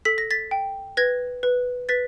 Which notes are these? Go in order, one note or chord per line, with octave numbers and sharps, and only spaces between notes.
A4 B6
A#6
A6 B6
G5
B4 G#6 A#6
B4
B4 A6 B6